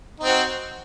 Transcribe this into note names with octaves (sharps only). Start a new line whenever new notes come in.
C4 D#4 F#4